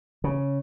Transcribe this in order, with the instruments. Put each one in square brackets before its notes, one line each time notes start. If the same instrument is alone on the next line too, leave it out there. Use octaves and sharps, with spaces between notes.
[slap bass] C#3